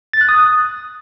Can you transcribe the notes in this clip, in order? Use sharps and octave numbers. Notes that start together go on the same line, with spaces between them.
A6
F#6
D#6